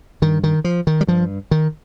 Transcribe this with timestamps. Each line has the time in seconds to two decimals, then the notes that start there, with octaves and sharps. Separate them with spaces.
0.22 G2 D#3
0.44 D#3
0.64 F3
0.87 D#3
1.01 G3
1.07 G2 F3
1.51 D#3